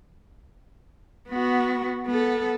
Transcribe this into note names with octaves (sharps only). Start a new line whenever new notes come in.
B3 F#4
B3 A4